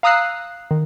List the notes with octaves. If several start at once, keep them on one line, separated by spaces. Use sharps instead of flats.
F5 A#5 D#6 E6 F#6 C7
D#3